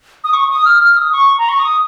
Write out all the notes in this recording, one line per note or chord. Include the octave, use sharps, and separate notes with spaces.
D#6
C#6
C#6
D#6
F6
F6
D#6
C#6
A#5
C#6
D#6